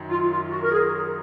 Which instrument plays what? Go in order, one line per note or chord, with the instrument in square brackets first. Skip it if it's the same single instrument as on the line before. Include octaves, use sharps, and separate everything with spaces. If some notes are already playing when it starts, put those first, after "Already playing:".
Already playing: [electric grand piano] F#2 D#3 F#3
[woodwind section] F4
F4
F#4
A#4
G#4